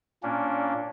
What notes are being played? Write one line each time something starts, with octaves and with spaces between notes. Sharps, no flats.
A#2 A#3 C#4 D4